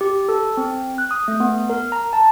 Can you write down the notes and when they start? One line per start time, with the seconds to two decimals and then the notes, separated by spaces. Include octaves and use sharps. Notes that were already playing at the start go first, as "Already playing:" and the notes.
0.01 G4
0.29 A4
0.57 C4
0.98 F#6
1.11 D#6
1.28 A3
1.40 B3
1.70 A#4
1.92 A#5
2.13 A5